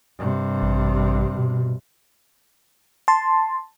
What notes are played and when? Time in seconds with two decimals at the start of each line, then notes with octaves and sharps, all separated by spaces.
0.18 G2 C3
0.62 A1
1.38 B2
3.08 A5 C6